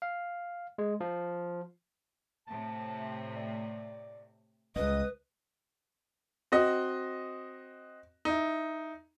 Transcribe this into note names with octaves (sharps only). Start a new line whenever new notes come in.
F5
G#3
F3
A2 C3 A5
D5
C#2 G3 B4 D#5 D#6
C4 F#4 D#5
D#4 E4